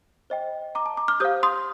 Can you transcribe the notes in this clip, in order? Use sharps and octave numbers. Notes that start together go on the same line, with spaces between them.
C5 D#5 G5
A#5 D6
A5
A#5 D6
D6 F6
G4 C5 F5 D#6 G6
C6 D#6